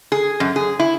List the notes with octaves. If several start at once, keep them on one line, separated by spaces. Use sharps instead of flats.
G#4
F#2
G#4
E4